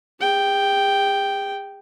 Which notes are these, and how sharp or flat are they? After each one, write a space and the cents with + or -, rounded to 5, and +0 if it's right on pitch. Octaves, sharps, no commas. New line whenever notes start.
G#4 -40 G5 +0